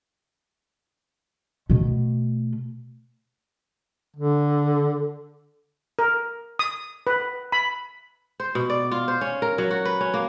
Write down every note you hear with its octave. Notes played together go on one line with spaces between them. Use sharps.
B2 A3
D3
A#4
D#6
B4
B5
C5
B2
D5
F4
C5
C#4
A#4
F#3
F#4
B4
C#4
A#3